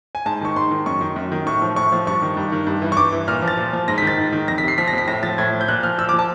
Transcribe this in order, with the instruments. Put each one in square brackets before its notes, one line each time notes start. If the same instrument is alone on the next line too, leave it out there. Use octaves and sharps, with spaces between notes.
[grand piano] G#5
G#2 A5
D#3 C#6
G#2 C6
D#3
F#2 C#6
D#3
F#2
D#3
A2 C#6
F3
A2 C#6
F3
G2 C#6
D#3
G2
D#3
G2
E3
C#6
G2 D6
E3
A#2 F6
F3
A6
A#2
F3
G#2 A#6
B6
D#3 A6
G#2
D#3
F2 A#6
B6
C3 C7
F3 B6
A#6
F2 B6
A2 A#6
F3 A6
A2 G#6
F3
G6
A#2 F#6
F3 F6
A#2 E6
D6
F3
A5